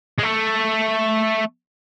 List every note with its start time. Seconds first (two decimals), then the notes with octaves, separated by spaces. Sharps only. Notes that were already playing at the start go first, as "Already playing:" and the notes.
0.18 G#3
0.23 A3